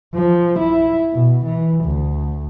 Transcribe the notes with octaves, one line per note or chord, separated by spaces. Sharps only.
F3
E4
B2
E3
D2